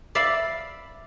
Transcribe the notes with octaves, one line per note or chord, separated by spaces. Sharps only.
D5 E5 F5 B5